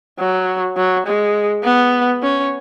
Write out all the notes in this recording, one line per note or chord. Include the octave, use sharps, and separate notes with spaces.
F#3
F#3
G#3
B3
C#4